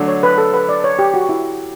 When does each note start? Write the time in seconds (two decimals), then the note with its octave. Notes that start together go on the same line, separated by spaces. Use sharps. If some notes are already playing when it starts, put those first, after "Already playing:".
Already playing: D3 F#3 A3 D4
0.08 C#5
0.23 B4
0.38 A4
0.53 B4
0.69 D5
0.84 C#5
0.99 G4
1.14 F#4
1.29 E4